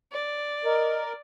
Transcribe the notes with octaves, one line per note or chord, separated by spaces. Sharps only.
D5
A#4 D#5